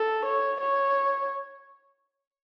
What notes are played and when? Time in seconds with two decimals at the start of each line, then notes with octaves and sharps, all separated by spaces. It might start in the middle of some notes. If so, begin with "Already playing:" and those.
Already playing: A4
0.25 C#5
0.60 C#5